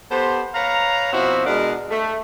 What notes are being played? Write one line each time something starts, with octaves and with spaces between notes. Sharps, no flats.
B3 G4 A4 C5
B4 C#5 F5 A#5
B2 F3 C4 E4 F#4
B2 G#3 D4 A#4
A3